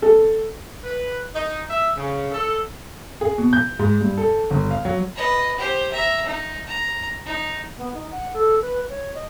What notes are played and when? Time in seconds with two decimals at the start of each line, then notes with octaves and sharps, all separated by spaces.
0.02 A4
0.84 B4
1.34 D#4
1.70 E5
1.96 C#3
2.32 A4
3.21 G#4
3.38 B2
3.53 G6
3.79 G#2
4.01 G2
4.18 A4
4.51 G1
4.71 F5
4.85 F#3
5.16 B4 D#5
5.58 G4 C5
5.91 E5 A#5
6.26 D#4
6.66 A#5
7.26 D#4
7.77 B3
7.94 D#4
8.11 F#5
8.33 A4
8.61 B4
8.89 C#5
9.14 D#5